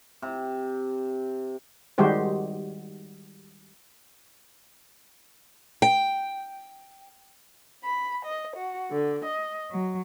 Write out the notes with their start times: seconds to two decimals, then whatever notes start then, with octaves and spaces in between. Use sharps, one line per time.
0.22 C3
1.98 D#3 G3 G#3 F#4 G4 C5
5.82 G5
7.83 B5
8.25 D#5
8.56 F#4
8.91 D3
9.25 D#5
9.69 F#3